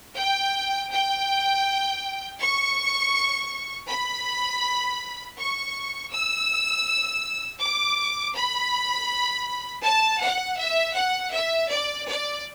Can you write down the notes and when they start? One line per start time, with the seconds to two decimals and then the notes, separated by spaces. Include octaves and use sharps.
0.16 G5
0.91 G5
2.40 C#6
3.88 B5
5.37 C#6
6.12 E6
7.60 D6
8.35 B5
9.83 A5
10.21 F#5
10.58 E5
10.95 F#5
11.32 E5
11.70 D5
12.07 D5